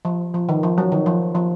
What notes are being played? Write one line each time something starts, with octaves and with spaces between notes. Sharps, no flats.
F3
F3
D#3
F3
F#3
D#3
F3
F3